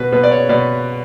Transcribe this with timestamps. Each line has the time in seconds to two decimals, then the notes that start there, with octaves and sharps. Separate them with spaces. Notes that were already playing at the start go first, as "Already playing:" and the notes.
Already playing: B2 F#4 B4
0.12 B2 B4
0.23 D5
0.31 C#5
0.49 B2 D5